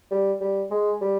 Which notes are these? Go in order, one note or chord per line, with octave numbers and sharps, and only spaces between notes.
G3
G3
G#3
G3